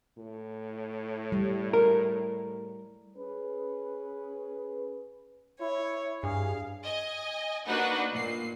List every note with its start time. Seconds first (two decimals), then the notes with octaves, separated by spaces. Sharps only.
0.18 A2
1.32 G3
1.73 A#4
3.17 C#4 G#4 B4
5.60 E4 C#5
6.23 G2 G#4 F5
6.83 D#5 G#5
7.65 A#3 D4 D#4 F#4 B4 F#5
8.11 A#2 C7